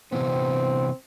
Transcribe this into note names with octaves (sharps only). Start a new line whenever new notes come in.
C3 E3 B3 C4